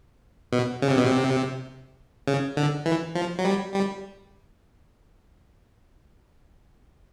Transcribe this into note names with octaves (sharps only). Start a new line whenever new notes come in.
B2
C#3
C3
B2
C3
C#3
D3
E3
F3
F#3
G3
G3